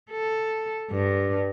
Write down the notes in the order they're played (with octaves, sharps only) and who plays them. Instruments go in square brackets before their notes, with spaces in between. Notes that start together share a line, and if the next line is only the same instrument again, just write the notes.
[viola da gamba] A4
G2